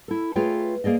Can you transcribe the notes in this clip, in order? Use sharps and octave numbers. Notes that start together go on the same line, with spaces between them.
E4 A4
A3 F4 G#4 B4 C#5 G5
A#3 G#4 D5 D#5